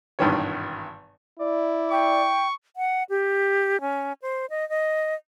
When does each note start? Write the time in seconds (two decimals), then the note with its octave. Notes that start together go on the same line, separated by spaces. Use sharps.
0.19 G#1 G2 B2 D#3 E3 C#5
1.39 E4 D5
1.91 G5 C#6
2.76 F#5
3.10 G4
3.81 C#4
4.22 C5
4.50 D#5
4.69 D#5